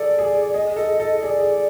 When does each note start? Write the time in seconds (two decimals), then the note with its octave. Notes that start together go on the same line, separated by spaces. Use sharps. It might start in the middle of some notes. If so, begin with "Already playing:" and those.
Already playing: G#4 A4 D5
0.19 G#4
0.53 G#4 D#5
0.76 A4 D#5
1.00 A4 D#5
1.22 G#4 D5
1.40 G#4